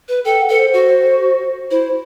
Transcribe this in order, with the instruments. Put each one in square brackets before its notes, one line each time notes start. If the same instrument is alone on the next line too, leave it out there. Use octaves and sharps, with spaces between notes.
[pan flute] B4
[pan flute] A4 [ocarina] G5
[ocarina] F#5
[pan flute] A4 [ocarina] B4
[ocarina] C5
[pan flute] F#4
[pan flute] E4 [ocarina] C5